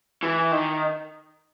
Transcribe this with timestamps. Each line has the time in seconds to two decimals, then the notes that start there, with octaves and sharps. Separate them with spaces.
0.23 E3
0.52 D#3